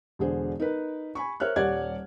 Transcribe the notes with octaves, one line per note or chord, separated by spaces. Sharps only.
E1 D3 G#4 C5
D#4 A#4 B4
G#5 B5 C#6
A#4 C5 C#5 E5 F6 F#6
D#1 G3 C#5 D5 F#5 G#6